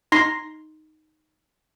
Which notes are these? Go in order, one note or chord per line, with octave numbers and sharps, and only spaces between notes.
D#4 C6 A#6 C7